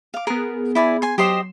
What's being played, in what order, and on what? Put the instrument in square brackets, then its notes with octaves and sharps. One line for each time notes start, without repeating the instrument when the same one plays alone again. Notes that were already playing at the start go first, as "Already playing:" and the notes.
[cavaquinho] F5 D6
[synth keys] B3 G#4 [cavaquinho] A#4
[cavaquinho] E4 D5 G#5
G#5 C6
[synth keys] F#3 C7 E7 [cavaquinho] G4 C5 D#5